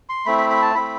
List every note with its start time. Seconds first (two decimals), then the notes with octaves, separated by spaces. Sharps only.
0.09 C6
0.26 A3 C4 E4 B5
0.38 B5
0.50 B5
0.62 A5
0.75 A3 C4 E4 B5